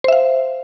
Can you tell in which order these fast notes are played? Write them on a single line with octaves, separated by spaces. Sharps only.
C5 E5 F5